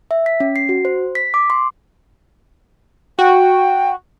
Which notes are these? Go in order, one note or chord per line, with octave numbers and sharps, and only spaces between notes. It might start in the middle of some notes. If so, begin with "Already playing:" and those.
E5
B6
C#4
C7
F#4
C5
B6
D6
C6
F#4 G5